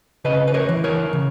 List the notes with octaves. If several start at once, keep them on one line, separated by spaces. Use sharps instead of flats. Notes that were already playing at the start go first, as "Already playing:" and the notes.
C#3 B4 D#5
B4
A#4 C#5
E3
A#4 C#5
C#3